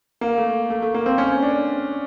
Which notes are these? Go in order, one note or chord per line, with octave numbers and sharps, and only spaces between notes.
A#3
A3
A3
A3
A#3
C4
C#4
D4